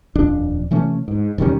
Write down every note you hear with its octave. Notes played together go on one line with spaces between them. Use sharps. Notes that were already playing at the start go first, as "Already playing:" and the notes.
D#1 F2 D4
C3 E3 A3 C#4
G#2
E1 D#3 G3 C#4